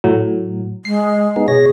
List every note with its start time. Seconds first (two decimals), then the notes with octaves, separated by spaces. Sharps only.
0.04 A2 F#3
0.85 G#3 C7
1.36 B3 D#4 G#4
1.48 B2 G#4 C#5 A#6